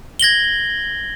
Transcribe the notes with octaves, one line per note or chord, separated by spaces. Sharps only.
G#6 A#6 F#7 G7